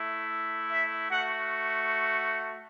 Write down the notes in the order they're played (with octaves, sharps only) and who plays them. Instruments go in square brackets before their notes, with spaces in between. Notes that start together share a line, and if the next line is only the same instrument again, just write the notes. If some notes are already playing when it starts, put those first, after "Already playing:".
Already playing: [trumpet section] A3 E4
E5
A3 F#4 F#5